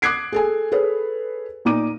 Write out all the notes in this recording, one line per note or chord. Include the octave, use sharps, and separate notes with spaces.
D6 D#6 F#6 G#6 C7 D7
G#4 A4 G#5
G#4 A4 B4 C#5
A#2 D#4 D6 D#7